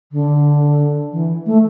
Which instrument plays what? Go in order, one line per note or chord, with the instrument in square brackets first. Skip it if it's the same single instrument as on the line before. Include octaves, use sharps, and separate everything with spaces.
[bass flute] D3
E3
A3